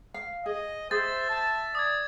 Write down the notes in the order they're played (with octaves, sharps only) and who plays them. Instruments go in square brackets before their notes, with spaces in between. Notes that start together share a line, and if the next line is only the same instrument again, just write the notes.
[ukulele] F5
[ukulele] G#4 [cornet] D#5
[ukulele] G#4 [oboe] C5 [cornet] E5 [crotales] A6
[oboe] A5
[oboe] D5 [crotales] D#6 G#6